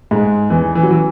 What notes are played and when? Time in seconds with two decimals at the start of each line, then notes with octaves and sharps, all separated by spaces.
0.11 G#2 G#3
0.50 E2 E3
0.75 E3
0.83 F#3
0.91 E3